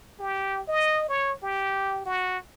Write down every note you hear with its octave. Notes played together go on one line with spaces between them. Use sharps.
G4
D#5
C#5
G4
F#4